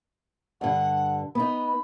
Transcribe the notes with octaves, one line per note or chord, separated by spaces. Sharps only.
G2 D3 F#5
B3 D#4 B5